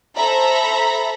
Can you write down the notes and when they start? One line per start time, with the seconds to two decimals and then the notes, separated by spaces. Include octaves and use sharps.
0.16 A4 C5 E5 A#5 B5